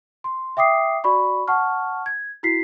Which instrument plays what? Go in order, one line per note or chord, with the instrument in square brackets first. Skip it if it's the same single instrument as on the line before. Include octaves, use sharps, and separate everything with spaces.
[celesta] C6
E5 G5 D6 D#6 C7
F#4 D5 B5 C#6
F#5 A5 C#6 F6
G#6
E4 F#4 B6 C7